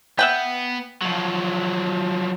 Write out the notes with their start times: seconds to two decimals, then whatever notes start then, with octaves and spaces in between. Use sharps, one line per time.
0.19 B3 E5 F#5 G5
1.02 F3 F#3